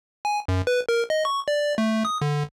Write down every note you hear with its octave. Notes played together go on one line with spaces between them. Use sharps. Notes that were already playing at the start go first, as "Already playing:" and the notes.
G#5
F#2
B4
A#4
D#5
C#6
D5
A3
D#6
D3